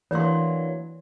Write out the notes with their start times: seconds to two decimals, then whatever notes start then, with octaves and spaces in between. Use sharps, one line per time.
0.11 E3 F#3 A#3 D4 C#5 C6